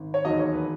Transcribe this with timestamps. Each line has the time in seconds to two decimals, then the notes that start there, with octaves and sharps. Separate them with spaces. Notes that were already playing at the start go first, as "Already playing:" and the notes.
Already playing: G#1
0.14 C#5
0.25 E1 D#2 D#3 F#3 D#5
0.39 C#5
0.53 B4